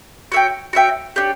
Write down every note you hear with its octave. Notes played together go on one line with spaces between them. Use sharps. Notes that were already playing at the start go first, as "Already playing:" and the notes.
F#4 C#5 E5 G5
F#4 C#5 E5 G5
D4 G4 C#5